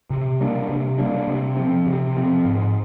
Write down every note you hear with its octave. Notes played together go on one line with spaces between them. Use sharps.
C3
G3 A#3 D4
C3
G3 A#3 D4
C3
F3 C4
C3
F3 C4
G#2